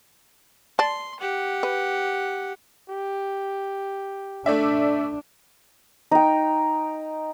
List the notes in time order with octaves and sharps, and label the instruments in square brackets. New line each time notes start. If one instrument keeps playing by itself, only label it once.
[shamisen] D5 A5 [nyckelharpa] C6
[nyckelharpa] G4 F#5
[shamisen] B4
[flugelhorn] G4
[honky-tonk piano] A3 D5 E5 [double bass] D4
[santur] D#4 G5